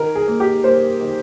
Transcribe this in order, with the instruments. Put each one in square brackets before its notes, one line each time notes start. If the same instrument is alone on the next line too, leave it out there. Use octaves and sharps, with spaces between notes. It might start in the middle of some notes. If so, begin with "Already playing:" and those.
Already playing: [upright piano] D#3 A#4
G#4
A#3
G4
A#3 C5
D#3